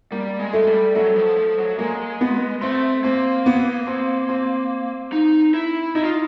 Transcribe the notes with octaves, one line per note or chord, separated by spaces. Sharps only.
G3 A#3
G#3
A3
G3
F#3 A3
F3
F3
F#3
G#3 A#3
B3
A3 C4
A#3 C4
B3
C4
C4
D#4
E4
D#4 E4
F4